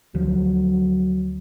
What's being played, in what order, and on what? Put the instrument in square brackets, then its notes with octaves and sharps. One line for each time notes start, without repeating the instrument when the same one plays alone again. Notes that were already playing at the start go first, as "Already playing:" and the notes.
[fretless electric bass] D2 F3 [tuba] F#3